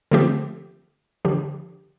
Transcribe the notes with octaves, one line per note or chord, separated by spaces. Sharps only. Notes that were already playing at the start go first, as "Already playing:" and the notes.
D3 F3 A3 C4 G4
D3 F3 D4 G4